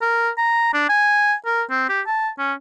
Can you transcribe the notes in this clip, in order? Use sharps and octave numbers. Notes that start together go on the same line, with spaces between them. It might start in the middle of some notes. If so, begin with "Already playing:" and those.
A#4
A#5
D4
G#5
A#4
C4
G4
A5
C#4